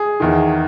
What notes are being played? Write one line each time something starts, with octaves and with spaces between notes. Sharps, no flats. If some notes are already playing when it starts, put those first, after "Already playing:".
Already playing: G#4
E2 D#3